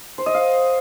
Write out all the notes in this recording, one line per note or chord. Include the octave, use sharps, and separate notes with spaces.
C5
D#5
F5